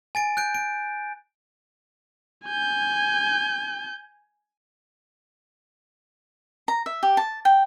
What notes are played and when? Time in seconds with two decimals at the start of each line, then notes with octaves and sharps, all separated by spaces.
0.15 G#5 A6 D7
0.37 F#6 G6 D7
0.55 D7
2.46 G#5 G6
6.68 A#5
6.86 E5
7.03 G4
7.17 A5
7.45 G5